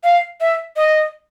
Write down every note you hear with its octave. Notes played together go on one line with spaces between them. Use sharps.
F5
E5
D#5